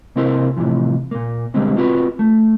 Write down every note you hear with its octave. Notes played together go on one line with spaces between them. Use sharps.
C3 A#3 C4 E4 A#4 C5
A2 C3 E3 F3
A#2 A#3
B2 D3 G3 G#3 A#3 C4
C4 F4 F#4 B4
A3